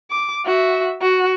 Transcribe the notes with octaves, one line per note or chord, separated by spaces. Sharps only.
D6
F#4 E5
F#4